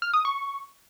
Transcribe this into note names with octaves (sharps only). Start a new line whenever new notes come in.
F6
D#6
C#6